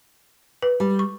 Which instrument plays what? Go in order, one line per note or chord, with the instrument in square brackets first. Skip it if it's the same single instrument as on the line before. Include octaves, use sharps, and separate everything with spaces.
[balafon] B4
[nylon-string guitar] G3
[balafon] C#6